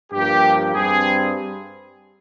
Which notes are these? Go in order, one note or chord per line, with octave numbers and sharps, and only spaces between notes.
G2 F3 A#3 G4
G2 G3 C4 G#4